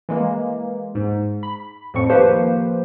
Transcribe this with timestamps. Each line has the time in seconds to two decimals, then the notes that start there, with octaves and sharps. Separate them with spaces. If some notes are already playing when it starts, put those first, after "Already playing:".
0.09 E3 G#3 A#3
0.95 G#2
1.43 B5
1.94 F2 A2 F3 C4 C#6 C#7
2.10 D#3 F3 A#3 G4 B4 C5